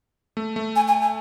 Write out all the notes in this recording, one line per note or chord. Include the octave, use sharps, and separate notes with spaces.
A3
A3
G#5
G#5
G#5